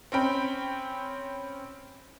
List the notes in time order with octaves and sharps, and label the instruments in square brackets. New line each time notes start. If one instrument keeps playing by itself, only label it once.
[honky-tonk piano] C4 C#4 G5 B5